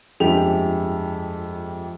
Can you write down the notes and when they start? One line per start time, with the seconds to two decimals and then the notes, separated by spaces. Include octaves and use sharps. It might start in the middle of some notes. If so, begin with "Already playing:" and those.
0.20 G1 F2 G#3 G4 F7